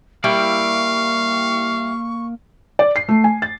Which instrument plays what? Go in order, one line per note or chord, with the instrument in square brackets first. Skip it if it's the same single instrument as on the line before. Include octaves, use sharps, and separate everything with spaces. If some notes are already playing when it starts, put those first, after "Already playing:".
[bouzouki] G3 E4 G5 [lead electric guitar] A#3 D5 [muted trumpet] F5 [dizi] C#6
[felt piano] D5
C7
A3
G#5
A6